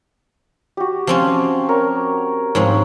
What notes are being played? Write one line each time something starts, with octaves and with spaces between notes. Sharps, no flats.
F#4 G4
F3 C4 C#4 C5 A5
A#4 C#5 C#6
G#2 F3 C4 C#5 B5